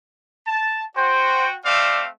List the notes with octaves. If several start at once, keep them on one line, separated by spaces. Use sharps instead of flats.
A5
F#4 C5 G5
A3 C4 D5 F5